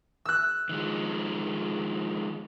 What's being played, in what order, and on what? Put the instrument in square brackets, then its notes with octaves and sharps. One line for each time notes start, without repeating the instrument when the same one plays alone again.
[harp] E6 F#6
[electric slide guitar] D#3 F3 G#3